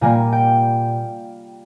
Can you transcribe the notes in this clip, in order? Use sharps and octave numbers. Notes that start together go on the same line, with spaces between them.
A#2 G3 A#3 G#5
G5